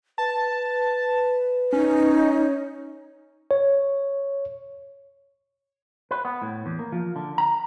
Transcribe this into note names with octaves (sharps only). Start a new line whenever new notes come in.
B4 A5
C#4 D#4
C#5
B4
B3
A2
E2
A#3
F3
D3
A#5